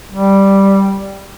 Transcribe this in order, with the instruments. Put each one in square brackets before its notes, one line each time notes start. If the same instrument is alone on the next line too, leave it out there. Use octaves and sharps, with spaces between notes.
[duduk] G3